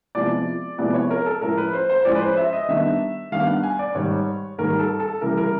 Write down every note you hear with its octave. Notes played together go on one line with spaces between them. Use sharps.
C3 F3 G#3 B3 E4 D5
C3 F3 G#3 B3 E4 D5
C#5
A#4
A4
A2 F3 G#3 C#4 A#4
B4
C5
C5
A2 F3 G#3 C#4 D5
B4
C5
E5
D#5
D#3 G3 B3 D4 E5
D#3 G3 B3 D4 F5
F#5
G#5
D5
G#2 D#3 G3 C#5
G#2 D#3 G3 A#4
A4
A4
C#3 E3 G3 A#4
A#4